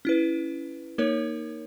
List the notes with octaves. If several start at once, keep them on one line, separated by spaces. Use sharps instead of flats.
C#4 E4 B4
A#3 D#4 A#4 C#5